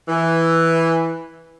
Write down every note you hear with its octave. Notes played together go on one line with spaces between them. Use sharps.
E3